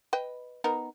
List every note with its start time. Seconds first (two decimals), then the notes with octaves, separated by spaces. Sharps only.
0.13 B4 D#5 G5
0.64 B3 D#4 A#4